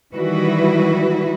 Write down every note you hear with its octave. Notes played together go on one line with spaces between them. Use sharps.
D#3 E3 G3 E4 F#4 B4